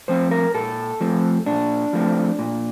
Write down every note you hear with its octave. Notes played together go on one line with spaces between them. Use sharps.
F3 A3 C4 C5
A#4
A#2 A4
F3 A3 C4
A#2 D4
F3 A3 C4
A#2